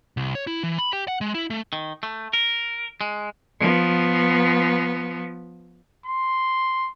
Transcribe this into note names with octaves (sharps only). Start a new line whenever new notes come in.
C2
C#5
E4
E3
B5
G4
F#5
G#3
E4
A3
D#3
A3
A#4
G#3
F3 B3
C6